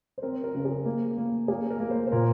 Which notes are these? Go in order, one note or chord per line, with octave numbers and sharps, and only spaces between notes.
C5
C4 A#4
A#4
C#3
A#4
G#4
A#3
A#3
A#3 G#4
A#4
A#3
C5
C5
A#2 A#4